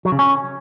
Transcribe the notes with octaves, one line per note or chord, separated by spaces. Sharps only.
F#3
C#3
C#4